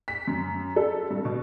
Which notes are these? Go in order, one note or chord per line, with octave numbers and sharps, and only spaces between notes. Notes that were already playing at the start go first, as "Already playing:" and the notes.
B6
F#2
A4
G2
B2